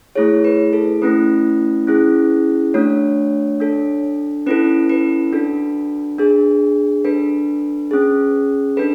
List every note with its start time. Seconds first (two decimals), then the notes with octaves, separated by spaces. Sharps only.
0.15 A3 E4 G#4 C#5
0.44 B4
0.73 A4
1.02 A3 C#4 E4 B4
1.87 C#4 E4 G#4
2.74 A3 D4 F#4 C#5
3.60 D4 A4
4.46 C#4 E4 A4 B4
4.89 B4
5.33 D4 F#4 A4
6.18 D4 G#4
7.05 D4 A4 B4
7.91 C#4 G#4
8.77 D4 A4 B4